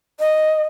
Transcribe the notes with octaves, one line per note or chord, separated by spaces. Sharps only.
D#5